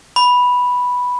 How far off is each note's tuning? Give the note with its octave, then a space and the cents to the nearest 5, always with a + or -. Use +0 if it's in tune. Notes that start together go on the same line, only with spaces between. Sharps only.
B5 -5